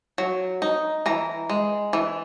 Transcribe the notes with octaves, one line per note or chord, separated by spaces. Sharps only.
F#3
D#4
E3 A#5
G#3
E3